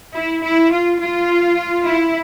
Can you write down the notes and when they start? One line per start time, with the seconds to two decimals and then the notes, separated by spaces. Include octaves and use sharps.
0.14 E4
0.43 E4
0.72 F4
1.00 F4
1.85 E4